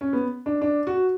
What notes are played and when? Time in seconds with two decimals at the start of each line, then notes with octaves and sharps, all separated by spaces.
0.01 C#4
0.13 B3
0.46 D4
0.61 D4
0.87 F#4